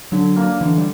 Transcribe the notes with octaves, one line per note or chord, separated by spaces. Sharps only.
D3 F#3
A#3 D4
D3 E3
G3